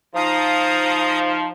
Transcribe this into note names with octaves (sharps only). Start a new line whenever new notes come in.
F3 D#4 F5 A#5 D#6